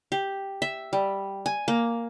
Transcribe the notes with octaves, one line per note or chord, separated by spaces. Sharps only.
G4
E5
G3
G#5
A#3